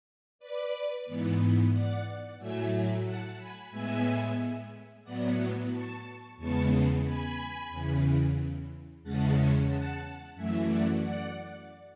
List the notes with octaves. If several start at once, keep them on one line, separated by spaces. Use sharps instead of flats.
B4 D5
G#2 E3 B3
D5 F#5
A2 F#3 A3 E5 G#5
F#5 A5
G#5 B5
A2 G#3 B3 E5 G#5
A2 F#3 B3 D5 F#5
A5 C#6
E2 C#3 G#3 B3 A5 C#6
G#5 B5
E2 C#3 E3
E2 C#3 G#3 C#4 F#5 A5
F#5 A5
F#2 E3 A3 E5 G#5
D5 F#5
D5 F#5